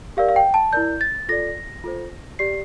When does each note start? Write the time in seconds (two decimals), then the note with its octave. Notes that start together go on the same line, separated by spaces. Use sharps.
0.17 G4 A#4 D5 F5
0.28 F5
0.36 G5
0.54 A5
0.73 E4 A#4 D5 G6
1.01 A6
1.29 F4 A4 D5 A#6
1.84 F4 A4 C5
2.39 G4 D5 C7